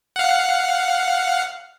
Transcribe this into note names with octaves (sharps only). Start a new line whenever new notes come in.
F5 F#5